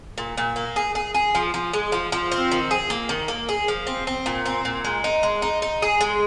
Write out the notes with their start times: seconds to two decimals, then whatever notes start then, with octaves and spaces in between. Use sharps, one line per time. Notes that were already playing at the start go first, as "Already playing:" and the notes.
0.18 A#2
0.37 A#2
0.56 A#3
0.76 G#4
0.95 G#4
1.14 G#4
1.35 F3
1.54 F3
1.73 G#3
1.92 F3
2.12 F3
2.32 C4
2.52 D#3
2.71 G#4
2.90 A#3
3.09 D#3
3.28 A#3
3.49 G#4
3.68 F3
3.87 C4
4.07 C4
4.26 A#2
4.46 C4
4.65 A#2
4.84 G#3
5.04 D#4
5.23 G#3
5.42 D#4
5.62 D#4
5.82 G#4
6.01 G#3